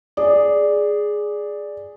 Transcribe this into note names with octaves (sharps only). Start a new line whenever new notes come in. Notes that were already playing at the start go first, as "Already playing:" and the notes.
G#4 D5